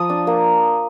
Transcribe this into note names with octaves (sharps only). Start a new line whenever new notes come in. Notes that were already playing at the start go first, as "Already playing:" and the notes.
Already playing: F3 D#6
D4
A#3